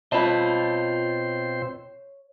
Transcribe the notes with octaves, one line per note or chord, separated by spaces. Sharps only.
B2 C4 F4 C5 C#5 D#5 A5 B5